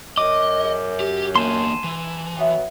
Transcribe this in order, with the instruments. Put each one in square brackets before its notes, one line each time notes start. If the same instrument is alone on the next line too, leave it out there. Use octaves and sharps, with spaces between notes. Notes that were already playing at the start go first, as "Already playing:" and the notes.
[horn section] F#2 [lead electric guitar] D#5 [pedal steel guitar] D6
[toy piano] G#4
[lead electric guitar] G4
[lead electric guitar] E2 A#3 [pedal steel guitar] G#5 A5 C6
[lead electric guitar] E3
[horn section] F#3 B3 [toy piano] E5 G5